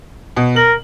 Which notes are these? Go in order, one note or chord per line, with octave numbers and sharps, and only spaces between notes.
B2
A#4 F#7